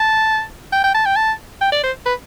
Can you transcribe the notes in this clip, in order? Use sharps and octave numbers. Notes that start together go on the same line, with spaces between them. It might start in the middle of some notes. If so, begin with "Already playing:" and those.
Already playing: A5
G5
G5
A5
G5
A5
G5
D5
C5
B4